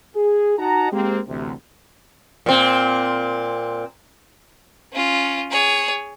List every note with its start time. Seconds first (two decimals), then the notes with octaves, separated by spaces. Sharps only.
0.15 G#4
0.59 D#4 F#4 D#5 F#5 A5 A#5
0.92 G#3 A#3 C4 G4
1.28 A1 D2 C3
2.46 A#2 C4
4.93 C#4 F4
5.51 G#4 C#5